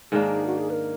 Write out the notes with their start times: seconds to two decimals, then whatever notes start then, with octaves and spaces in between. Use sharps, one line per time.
0.12 G#2 D#3 A#3 D4 G#4
0.47 F#4
0.58 G#4
0.70 B4
0.73 A#4